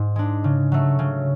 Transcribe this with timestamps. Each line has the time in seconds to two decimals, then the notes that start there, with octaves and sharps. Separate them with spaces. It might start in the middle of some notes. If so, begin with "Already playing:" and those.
Already playing: G#2
0.16 G#3 D4
0.44 C#3
0.72 F#3 A3
0.99 C#3